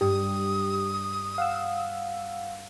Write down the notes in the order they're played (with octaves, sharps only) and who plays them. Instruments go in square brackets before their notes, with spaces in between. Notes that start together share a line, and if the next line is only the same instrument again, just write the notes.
[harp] G2 [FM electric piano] G4 [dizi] D#6
[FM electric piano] F5 F#5 E6